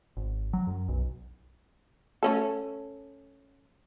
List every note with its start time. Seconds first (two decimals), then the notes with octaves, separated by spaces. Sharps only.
0.17 G#1
0.53 F#3
0.67 F#2
0.89 B1
2.23 A3 C#4 A4